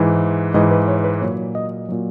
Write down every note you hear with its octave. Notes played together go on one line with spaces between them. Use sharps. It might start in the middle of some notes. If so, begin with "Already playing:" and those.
Already playing: G#2 E3
G#2 E3 D#5
B4
C#5
B4
A#2 F#3 C#5
D#5
A#2 F#3